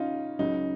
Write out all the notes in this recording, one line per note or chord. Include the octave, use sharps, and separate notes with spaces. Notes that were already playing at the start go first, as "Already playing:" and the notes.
Already playing: C#3 C#4 D#4 F4
C#2 C#3 F#3 D#4